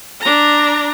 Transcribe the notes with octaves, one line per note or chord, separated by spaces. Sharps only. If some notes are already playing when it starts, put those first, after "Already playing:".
D4 A#5